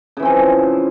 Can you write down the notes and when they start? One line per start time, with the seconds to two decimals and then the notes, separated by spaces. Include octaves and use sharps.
0.17 C#3
0.20 E3
0.22 C4
0.25 F3